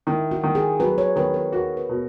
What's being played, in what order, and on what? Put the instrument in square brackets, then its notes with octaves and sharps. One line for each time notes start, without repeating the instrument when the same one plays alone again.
[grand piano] D#3 [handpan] E4
[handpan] F#4
[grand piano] D#3
[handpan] G#4
[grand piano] F#3 [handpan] B4
[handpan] C#5
[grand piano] D#3 [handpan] B4
[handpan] A#4
[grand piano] F#4 [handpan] A#4
[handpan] B4
[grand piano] B2